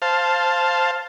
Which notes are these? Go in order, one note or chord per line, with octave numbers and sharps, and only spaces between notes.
C5 F5 A5